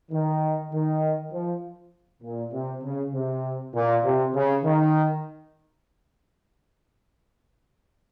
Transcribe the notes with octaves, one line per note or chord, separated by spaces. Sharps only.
D#3
D#3
F3
A#2
C3
C#3
C3
A#2
C3
C#3
D#3